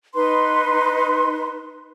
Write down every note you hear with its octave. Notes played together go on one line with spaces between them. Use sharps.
D#4 B4 C6